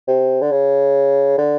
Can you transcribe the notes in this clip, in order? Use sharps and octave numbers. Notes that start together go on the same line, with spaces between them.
C3
D3
C#3
D3